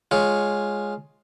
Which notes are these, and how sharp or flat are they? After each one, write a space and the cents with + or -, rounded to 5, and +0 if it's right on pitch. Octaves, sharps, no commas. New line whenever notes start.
G#3 +0 F4 +0 C#5 +0